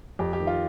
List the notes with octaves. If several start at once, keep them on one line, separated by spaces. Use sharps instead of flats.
F2 G4
G4
D#3
F4